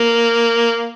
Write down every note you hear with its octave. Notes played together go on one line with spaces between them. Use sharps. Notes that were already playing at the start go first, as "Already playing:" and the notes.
Already playing: A#3